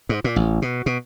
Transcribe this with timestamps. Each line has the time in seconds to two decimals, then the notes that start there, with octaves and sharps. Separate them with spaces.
0.09 G#2
0.24 A#2
0.36 A1
0.62 B2
0.86 B2